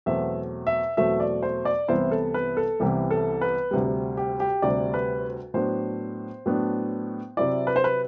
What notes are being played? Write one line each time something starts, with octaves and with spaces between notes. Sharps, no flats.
E2 B2 F#3 A3 C4 E5
E5
E2 B2 F#3 A3 C4 E5
D5
C5
D5
C2 C3 E3 B3 E4 C5
A4
B4
A4
C2 C3 E3 B3 E4 G4
A4
B4
D2 C3 G3
G4
G4
D2 C3 G3 D5
B4
A2 F#3 B3 D4 C5
A2 F#3 B3 D4
C3 F#3 C4 E4 D5
B4
C5
B4